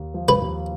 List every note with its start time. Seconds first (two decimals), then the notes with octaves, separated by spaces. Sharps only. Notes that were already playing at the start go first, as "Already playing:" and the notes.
Already playing: D#2
0.14 F3
0.28 B4
0.42 D#2